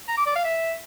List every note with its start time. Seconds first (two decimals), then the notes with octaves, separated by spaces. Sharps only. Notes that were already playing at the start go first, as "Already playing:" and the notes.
0.08 A#5
0.17 D6
0.27 D5
0.36 F5
0.45 E5